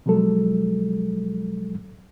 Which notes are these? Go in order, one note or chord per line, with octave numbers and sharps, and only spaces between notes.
B2 F3 F#3 G#3 A4